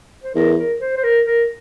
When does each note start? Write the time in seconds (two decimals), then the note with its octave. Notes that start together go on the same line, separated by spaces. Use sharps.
0.24 C5
0.35 E2 A#4
0.58 A#4
0.80 C5
0.97 C5
1.04 A#4
1.27 A#4